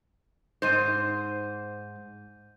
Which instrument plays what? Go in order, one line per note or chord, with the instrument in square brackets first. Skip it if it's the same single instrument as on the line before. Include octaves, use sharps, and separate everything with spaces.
[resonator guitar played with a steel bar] G#2 C5 [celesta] G6 D#7